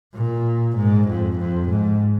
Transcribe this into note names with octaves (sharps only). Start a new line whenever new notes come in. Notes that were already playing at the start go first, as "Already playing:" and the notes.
A#2
G#2
F2
F2
G#2